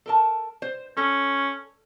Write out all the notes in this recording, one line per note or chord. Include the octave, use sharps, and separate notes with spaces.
A4 A#4 A5
C5
C#4 A4